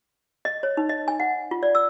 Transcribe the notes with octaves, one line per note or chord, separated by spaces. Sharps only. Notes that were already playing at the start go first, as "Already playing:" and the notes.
D#5
C#5
D#4
D#5
G#5
F#5
F4
D5
E6